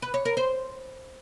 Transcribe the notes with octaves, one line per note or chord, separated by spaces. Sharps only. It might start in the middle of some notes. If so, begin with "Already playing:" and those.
B4
C#5
A#4
C5